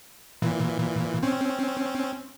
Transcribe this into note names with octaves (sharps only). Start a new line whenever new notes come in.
A#2 E3
C4 C#4